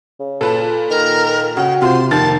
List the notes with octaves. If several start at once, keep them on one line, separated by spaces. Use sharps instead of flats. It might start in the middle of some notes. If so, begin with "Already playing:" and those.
C#3
A#2 A4 B4 A5
D#3 A#4
C#3 F#4 G5
C3 F4 C5 C6
F1 D#3 A#3 A5 A6